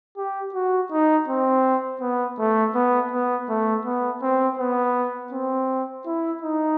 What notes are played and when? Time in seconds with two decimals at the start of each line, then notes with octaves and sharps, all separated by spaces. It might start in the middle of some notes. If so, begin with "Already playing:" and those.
0.17 G4
0.54 F#4
0.91 D#4
1.28 C4
2.01 B3
2.39 A3
2.75 B3
3.11 B3
3.49 A3
3.85 B3
4.23 C4
4.59 B3
5.32 C4
6.06 E4
6.42 D#4